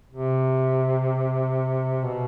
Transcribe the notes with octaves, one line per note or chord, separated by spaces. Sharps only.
C3
B2